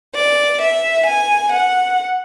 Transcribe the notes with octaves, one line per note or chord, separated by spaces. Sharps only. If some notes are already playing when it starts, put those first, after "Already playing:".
D5
E5
G#5
F#5